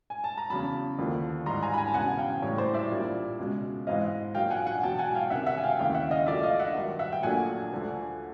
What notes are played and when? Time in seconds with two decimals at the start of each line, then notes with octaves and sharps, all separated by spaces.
0.10 G#5
0.24 A5
0.38 A#5
0.50 E2 C#3 F#3 A5 B5
0.99 D#2 D3 F3 A#3
1.46 G#2 E3 G3 A#5 C6
1.63 G#5 A#5
1.74 B5
1.78 G#5 A#5
1.87 A5
1.94 E1 E2 C#3 F#5 G#5
2.18 F5 G5
2.42 A2 E3 G3 C#5
2.58 C5 D5
2.74 D5 E5
2.90 A#1 A#2 G3
3.39 C#2 B2 G#3
3.87 G#2 E3 G#3 C4 D#5 F5
4.34 A#1 A#2 F#3 F5 G5
4.50 F#5 G#5
4.66 F#5 G#5
4.83 E2 B2 F#3 G5 A5
4.99 F#5 G#5
5.15 F5 G5
5.30 C2 C3 D#3 E5 F#5
5.47 E5 F#5
5.57 G#5
5.63 F5 G5
5.79 D#2 C#3 E3 F5 G5
5.94 E5 F#5
6.11 D#5 F5
6.26 A#1 A#2 F#3 A3 D5 E5
6.43 D#5 F5
6.59 E5 F#5
6.76 G2 D#3 F#3
6.99 E5 F#5
7.13 G5
7.23 A#1 A#2 F#3 A3 D4 F#5 G#5
7.72 D2 D3 F3 A3